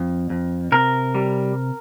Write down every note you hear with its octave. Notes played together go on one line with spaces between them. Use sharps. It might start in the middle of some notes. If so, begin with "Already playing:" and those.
Already playing: F2
F2
C3 A#4
G3